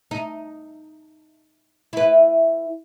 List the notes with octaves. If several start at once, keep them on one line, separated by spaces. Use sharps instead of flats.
D#4
E4 B4